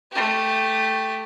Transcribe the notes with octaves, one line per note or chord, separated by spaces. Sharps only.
A3 G4